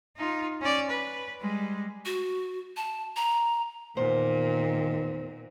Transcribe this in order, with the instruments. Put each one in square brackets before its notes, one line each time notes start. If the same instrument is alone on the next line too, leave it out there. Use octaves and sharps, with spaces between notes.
[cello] D#4 F4
C#4 D5
B4
G3 G#3
[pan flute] F#4
A5
A#5
[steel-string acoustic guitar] E2 C5 [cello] A#2 [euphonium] D#3